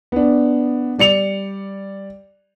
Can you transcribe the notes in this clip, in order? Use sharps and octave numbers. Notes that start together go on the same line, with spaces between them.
B3 D4
G3 D5 C#7 F7